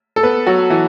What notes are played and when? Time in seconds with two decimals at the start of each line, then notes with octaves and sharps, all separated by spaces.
0.16 A4
0.23 B3 B4
0.47 F#3 F#4
0.70 E3